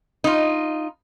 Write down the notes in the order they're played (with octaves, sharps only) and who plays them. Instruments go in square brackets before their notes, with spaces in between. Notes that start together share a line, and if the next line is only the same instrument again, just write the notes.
[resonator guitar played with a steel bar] D#4 F4